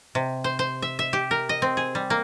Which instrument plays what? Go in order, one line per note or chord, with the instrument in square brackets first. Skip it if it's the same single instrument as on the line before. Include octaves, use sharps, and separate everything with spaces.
[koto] C3
C5
C5
E5
E5
G4
A#4
D#5
C4
G#4
G3
A#3